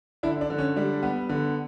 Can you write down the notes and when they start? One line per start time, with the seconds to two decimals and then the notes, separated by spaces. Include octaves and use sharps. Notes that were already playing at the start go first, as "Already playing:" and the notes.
0.23 D3 D4 E4
0.41 D4
0.50 D3
0.58 C#4
0.76 G3 D4
1.03 B3
1.29 D3